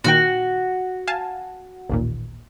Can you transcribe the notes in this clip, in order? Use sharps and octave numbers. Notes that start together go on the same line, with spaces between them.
A#2 D#3 F#4 G5
F5 G#5 A5
A1 D#2 A#2